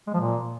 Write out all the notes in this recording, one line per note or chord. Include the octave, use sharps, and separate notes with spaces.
G#3
F3
A#2